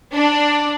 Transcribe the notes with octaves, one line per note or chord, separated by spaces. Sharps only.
D4